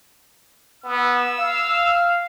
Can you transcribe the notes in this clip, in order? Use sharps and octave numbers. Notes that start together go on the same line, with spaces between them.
B3 E6
F5